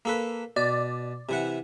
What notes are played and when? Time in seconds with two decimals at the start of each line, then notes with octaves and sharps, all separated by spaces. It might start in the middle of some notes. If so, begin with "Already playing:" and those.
0.05 A#3 A4 B4
0.56 B2 D5
1.29 C3 E3 F#5